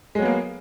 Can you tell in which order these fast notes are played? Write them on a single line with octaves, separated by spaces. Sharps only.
G#3 F#3 B3 A#3